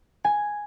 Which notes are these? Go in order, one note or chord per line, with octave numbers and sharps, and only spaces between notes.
G#5